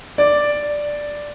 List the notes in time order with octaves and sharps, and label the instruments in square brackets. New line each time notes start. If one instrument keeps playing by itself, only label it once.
[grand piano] D5